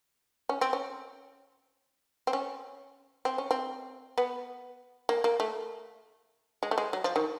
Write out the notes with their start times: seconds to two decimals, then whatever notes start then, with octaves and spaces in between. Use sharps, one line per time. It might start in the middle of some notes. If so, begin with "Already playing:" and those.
0.49 C#4
0.61 C4
0.73 C#4
2.27 C4
2.33 C#4
3.25 C4
3.38 C#4
3.51 C4
4.18 B3
5.09 A#3
5.24 A#3
5.40 A3
6.63 G#3
6.71 A3
6.78 G#3
6.93 F#3
7.04 F3
7.16 D#3